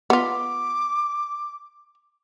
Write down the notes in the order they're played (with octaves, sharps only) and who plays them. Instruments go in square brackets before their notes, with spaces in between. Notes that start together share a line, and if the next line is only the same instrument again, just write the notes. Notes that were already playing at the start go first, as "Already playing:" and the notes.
[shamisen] B3 F4 [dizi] D6